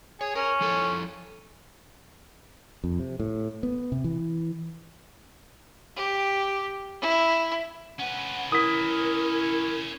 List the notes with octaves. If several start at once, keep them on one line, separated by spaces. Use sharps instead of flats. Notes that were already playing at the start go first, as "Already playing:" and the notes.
G#4 C#5
C#4 A#4
F3 E4 A4
F2
C3
A2
B3
C3
E3
G4
E4
C#4 B4 F#5
E4 A#4 D#6 B6